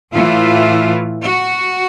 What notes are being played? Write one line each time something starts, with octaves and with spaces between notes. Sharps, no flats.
A2 E3 F4
F#4